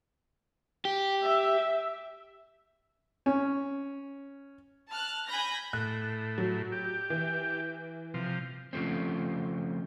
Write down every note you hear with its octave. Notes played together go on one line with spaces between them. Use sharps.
G4
E5
C#4
A5 F6 F#6
G#5 B5 G6 A#6
A2 F#6
F#3
G4
E3
C3 F3
C#3 F3 A3 C4